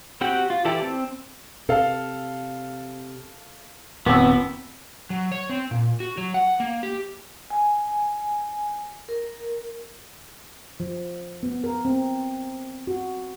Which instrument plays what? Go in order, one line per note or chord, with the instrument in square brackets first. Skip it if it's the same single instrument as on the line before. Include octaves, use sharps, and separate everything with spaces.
[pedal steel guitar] C4 F#4 G4 F#5 G5
F4
E3 E4 G4 A4 D5
C4
[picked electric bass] C3 [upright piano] A4 F5
[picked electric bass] F1 A#2 [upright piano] D#2 E6 [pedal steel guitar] B3 [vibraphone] C4
[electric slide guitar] F#3
C#5
C4
A#2
F#4
F#3
F#5
A#3
G4
[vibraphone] G#5
A#4
[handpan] F3
B3
A#4
C4
F#4